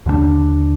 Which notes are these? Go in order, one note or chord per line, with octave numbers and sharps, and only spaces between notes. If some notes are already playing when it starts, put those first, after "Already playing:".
D#2 D3 G3 D4